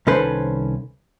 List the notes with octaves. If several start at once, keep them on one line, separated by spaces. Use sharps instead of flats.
C2 D#3 C#4 A4 B4 C5